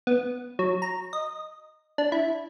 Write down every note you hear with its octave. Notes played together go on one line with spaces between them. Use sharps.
B3
F#3
A#5
D#5
D4
E4